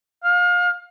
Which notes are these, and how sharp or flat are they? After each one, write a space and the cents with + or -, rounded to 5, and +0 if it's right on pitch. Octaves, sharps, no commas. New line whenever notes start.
F5 +30